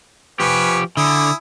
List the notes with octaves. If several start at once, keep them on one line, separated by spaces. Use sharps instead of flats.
F3 G4 B4 G#5 C#6
D3 E4 G#5 D#6